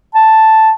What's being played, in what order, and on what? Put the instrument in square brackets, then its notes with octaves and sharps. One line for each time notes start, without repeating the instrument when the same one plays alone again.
[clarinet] A5